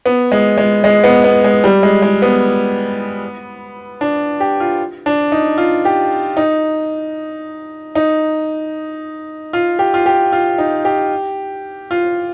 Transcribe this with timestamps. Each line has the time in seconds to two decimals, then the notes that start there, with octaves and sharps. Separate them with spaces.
0.06 B3
0.32 G#3
0.58 G#3
0.84 G#3
1.04 B3
1.24 B3
1.44 G#3
1.64 G3
1.83 G#3
2.02 G#3
2.22 B3
4.01 D4
4.40 G4
4.60 F4
5.06 D4
5.32 D#4
5.58 F4
5.85 G4
6.37 D#4
7.95 D#4
9.53 F4
9.79 G4
9.94 F4
10.06 G4
10.32 F4
10.58 D#4
10.85 G4
11.91 F4